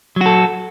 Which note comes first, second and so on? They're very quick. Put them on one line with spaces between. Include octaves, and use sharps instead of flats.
F#3 F#4 A4